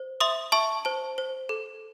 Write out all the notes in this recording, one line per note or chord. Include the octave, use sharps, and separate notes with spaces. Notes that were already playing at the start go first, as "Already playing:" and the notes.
Already playing: C5
E5 C6 D#6
E5 A5 C#6
C5 A5
C5
A4